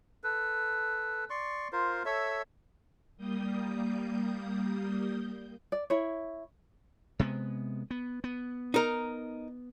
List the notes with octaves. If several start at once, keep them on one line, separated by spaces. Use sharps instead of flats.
A4 B4
D5 C6 C#6
F4 A#4 C5
A4 C#5 E5
G3 A#3 D#6 G6
D5
E4 C#5
C3 G#3 B3
B3
B3
D#4 A#4